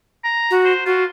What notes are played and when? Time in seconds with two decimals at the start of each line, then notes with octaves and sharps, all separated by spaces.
0.24 A#5
0.51 F#4
0.65 C5
0.86 F4 F#4